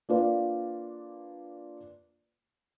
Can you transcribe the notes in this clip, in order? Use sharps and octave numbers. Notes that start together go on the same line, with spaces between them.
A#3 D4 F4 B4 D5